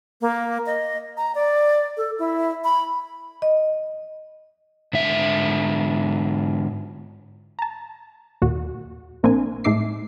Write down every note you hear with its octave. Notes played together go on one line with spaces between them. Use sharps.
A#3
D#5
A#5
D5
A4
E4
B5
D#5
G#2 D3 E5
A5 A#5
D#2 A#2 F#4
A#1 A#3 C4 D4 G#5
A2 G#3 D#4 E5 D6 C7